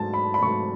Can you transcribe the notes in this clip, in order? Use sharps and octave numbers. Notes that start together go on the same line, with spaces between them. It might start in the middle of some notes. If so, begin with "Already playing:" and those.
Already playing: G#2 F#3 A3 A5
B5
B5
G#2 F#3 A3 C#6